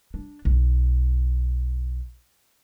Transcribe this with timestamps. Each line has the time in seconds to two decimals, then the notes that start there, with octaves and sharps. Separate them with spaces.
0.14 D4
0.45 B1